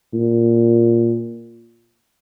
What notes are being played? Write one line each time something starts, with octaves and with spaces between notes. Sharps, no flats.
A#2